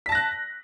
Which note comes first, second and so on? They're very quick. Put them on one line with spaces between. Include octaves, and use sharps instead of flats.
B6 A5 A#6 F#6